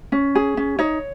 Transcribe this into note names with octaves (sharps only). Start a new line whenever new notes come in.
C#4
G#4
C#4
D#4 C#5